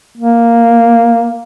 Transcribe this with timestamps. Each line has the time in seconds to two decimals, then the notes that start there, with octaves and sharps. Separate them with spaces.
0.17 A#3